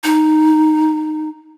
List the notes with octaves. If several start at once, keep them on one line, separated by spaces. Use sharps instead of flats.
D#4